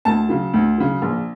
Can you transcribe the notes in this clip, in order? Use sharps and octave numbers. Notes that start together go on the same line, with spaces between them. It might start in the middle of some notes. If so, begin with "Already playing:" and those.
D2 A5
C#3 F#3
D2
C#3 F#3
A#1